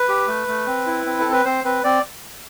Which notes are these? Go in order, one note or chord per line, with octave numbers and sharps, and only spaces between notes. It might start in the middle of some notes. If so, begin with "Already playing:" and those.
Already playing: B4
G4
A3
A3
C4
E4
C4
C4 A4
B4
C4 C5
C4 B4
C4 D5